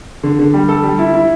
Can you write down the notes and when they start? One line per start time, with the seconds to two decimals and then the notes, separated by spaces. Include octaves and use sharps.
0.23 D3
0.39 D3
0.54 G3
0.69 A4
0.84 G3
0.99 E4
1.14 E4